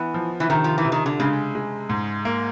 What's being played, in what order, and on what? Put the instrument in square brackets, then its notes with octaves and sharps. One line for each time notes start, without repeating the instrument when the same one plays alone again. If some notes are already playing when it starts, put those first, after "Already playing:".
Already playing: [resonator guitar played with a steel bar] E3 [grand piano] B3
[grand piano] F3
[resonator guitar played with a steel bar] E3
[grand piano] C3 [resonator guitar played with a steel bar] D#3
[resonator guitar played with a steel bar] F3
E3
[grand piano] C3
[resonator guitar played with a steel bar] D#3
D3
[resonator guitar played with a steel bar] C#3 [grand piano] G#3
[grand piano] G#3
G#2
A#3